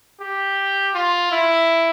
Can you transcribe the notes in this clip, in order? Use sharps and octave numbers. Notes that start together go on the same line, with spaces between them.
G4
F4
E4